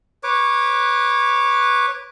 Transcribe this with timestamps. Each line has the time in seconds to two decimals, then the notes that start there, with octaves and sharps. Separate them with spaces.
0.23 B4 C#5 D6